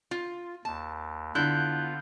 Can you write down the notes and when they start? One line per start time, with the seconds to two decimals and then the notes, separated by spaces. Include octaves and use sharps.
0.11 F4
0.65 D#2 A5
1.35 D3 B3 E4 F4 F#6 G6